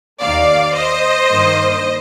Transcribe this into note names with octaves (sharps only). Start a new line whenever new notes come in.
D#2 D#3 A#3 D5 F5
C5 D#5
G2 D#3 A#3